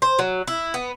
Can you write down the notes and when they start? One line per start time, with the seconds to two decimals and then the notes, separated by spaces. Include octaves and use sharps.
0.02 C5
0.19 F#3
0.47 E4
0.74 B3